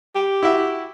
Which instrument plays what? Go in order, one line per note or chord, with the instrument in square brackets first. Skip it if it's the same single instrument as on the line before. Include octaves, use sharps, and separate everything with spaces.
[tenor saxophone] G4
[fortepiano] E4 F#4 E5